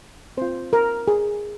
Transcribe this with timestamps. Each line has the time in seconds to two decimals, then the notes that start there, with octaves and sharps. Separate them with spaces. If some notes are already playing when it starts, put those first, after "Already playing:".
0.37 C4 F4 C5
0.73 A#4
1.08 G#4